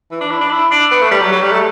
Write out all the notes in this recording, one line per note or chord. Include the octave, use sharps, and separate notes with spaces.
E3
D4
E4
D4
E4
D4
B3
A3
G3
F#3
F#3
G3
A3